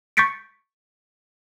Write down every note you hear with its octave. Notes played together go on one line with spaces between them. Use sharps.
C#6 G6 A6 B6 C#7 D7